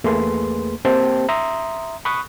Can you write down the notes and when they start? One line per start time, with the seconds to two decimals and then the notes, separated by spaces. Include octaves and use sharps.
0.04 E2 A3 A#3 G#4 B4 C6
0.85 A#3 C4 G4 C5 G5 A5
1.29 E5 A#5 C6 D#6
2.05 B5 C#6 D#6 F#6